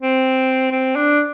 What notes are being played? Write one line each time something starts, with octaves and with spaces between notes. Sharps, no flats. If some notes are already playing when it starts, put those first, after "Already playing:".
C4
C4
D4